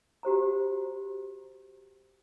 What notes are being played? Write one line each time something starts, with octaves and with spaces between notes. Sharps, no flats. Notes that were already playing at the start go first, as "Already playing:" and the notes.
F#4 G4 C5 A#5